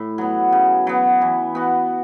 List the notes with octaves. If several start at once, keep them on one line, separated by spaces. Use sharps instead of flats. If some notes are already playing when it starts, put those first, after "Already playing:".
Already playing: A2
F#3 B3
C#3
F#3 B3
E3
B3 F#4